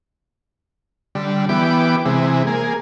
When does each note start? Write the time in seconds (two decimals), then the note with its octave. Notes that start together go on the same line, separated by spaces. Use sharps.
1.15 D3 G3
1.49 E3 B3 G4 D6
2.05 C3 E3 G#3
2.47 A#3 G#4